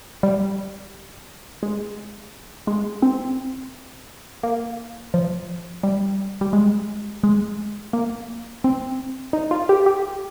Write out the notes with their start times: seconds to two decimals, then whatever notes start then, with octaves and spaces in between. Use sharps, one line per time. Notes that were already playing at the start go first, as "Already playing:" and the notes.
0.23 G3
1.63 G#3
2.67 G#3
3.02 C4
4.43 A#3
5.14 F3
5.83 G3
6.41 G3
6.53 G#3
7.23 G#3
7.93 A#3
8.64 C4
9.33 D#4
9.51 F4
9.69 G4
9.86 G4